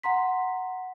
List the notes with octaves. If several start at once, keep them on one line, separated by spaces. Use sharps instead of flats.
F#5 A#5 C6 B6